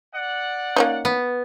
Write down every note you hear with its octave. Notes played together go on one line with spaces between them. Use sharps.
D5 F#5
A#3 C#4 D#4
B3